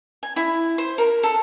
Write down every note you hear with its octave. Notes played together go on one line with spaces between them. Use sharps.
G#5
E4
C5
A#4
A4